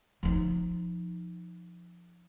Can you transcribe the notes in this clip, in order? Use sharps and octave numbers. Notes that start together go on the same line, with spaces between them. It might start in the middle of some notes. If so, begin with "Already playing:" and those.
F3 D#4